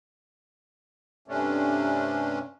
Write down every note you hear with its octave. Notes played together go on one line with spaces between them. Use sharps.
G2 C3 A3 C#4 D4